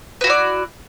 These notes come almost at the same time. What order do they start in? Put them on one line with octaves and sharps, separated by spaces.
B4 F#4 E4 D5